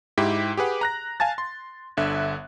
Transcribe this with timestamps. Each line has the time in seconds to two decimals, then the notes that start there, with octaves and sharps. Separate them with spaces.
0.18 G#2 E4 G4 B6
0.57 G4 G#4 B4 F#5
0.81 A#5 F#6 A#6
1.20 F5 G#5 A5 A6
1.38 C6
1.97 G1 D3 E5 F#6